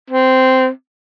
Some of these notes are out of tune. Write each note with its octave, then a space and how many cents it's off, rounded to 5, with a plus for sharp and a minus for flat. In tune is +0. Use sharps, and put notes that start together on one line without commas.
C4 -10